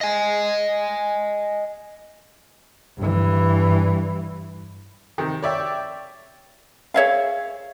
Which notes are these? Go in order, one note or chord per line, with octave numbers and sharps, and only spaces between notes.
D#5 G#5
G2 E3
C3 D#3
C#5 D5 E5 G5
G#4 C#5 E5 F5